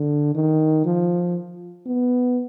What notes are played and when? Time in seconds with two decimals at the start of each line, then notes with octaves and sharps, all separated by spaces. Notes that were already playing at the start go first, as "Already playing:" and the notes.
Already playing: D3
0.35 D#3
0.85 F3
1.86 B3